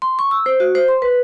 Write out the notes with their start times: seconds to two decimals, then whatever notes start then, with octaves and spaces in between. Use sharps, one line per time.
0.02 C6
0.19 C#6
0.31 E6
0.46 C5
0.60 F#4
0.75 C5
0.88 C6
1.02 B4